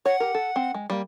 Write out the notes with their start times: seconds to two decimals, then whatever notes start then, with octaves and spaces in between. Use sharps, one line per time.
0.06 C#5 F#5
0.20 G4 A#4
0.34 A4
0.56 C4
0.74 G#3
0.90 G3 A#3